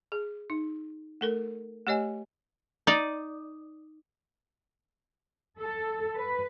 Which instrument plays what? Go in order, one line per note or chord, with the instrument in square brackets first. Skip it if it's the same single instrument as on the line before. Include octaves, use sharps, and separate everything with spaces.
[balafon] G#4
D#4
A3 A4 A#4
A3 G4 C#5 D#5 G#5
[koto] D#4 D5
[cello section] A4
B4